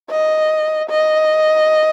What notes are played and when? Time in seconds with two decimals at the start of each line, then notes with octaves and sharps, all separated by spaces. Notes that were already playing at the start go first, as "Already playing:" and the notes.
0.11 D#5
0.90 D#5